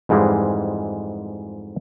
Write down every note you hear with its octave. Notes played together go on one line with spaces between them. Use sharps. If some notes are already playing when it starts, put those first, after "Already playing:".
F2 G#2 E3 G3 G#3